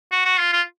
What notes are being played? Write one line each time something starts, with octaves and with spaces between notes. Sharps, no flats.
F#4
F#4
F4
F4